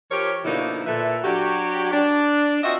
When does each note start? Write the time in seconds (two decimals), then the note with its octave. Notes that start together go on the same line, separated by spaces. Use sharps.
0.11 F3 G4 A#4 C#5
0.45 B2 D3 F3 A#3 D#4 E4
0.86 A#2 A4 B4 E5
1.24 F#3 D4 F#4 G4
1.91 D4
2.63 C4 F4 F#4 D#5 E5